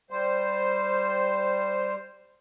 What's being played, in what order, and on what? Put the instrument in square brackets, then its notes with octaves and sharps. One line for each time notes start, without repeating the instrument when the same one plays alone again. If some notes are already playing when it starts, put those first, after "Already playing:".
[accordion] G3 C5